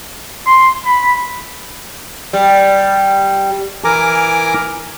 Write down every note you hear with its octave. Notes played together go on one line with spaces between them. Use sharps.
C6
B5
G3
E3 A#4 G#5 A#5 D6